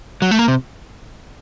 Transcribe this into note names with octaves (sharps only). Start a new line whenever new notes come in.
F#3
A3
A#3
C3